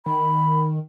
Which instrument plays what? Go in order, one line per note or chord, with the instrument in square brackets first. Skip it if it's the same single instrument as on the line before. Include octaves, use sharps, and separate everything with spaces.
[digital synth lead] D#3 [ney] B5